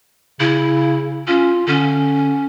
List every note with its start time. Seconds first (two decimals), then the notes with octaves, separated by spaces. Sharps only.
0.40 C#3 E4
1.28 C#4 F4
1.67 D3 C#4